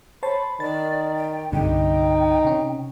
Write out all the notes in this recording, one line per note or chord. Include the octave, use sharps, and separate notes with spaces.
C5 C#5 A5 B5
D#3 D5 A6
G5
C2 G2 D3 D#4 G5
C3 C#4